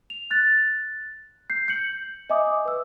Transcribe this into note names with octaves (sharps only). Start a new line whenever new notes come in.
F7
F#6 A6
G6 C7
G6 C#7 F#7
D#5 E5 G#5 D6 D#6
B4 E6